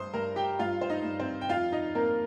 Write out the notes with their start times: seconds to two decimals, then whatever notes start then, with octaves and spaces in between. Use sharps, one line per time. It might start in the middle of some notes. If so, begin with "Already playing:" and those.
Already playing: G2 C5 C6 D#6
0.14 G2 A#4 A#5
0.36 G4 G5
0.59 G2 F4 F5
0.81 C5
0.90 D#4 D#5
1.04 G2
1.19 C4 C5
1.41 G5
1.49 F2 F4 F5
1.72 D#4 D#5
1.95 A#3 C4 A#4